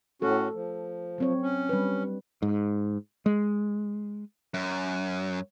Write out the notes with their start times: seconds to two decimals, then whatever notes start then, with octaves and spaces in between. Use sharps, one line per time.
0.22 A2 A3 C#4 F#4 A4
0.54 F3
1.18 F#3 C4 C#5
1.42 C#4
1.69 G3 D4 B4
2.42 G#2
3.26 G#3
4.54 F#2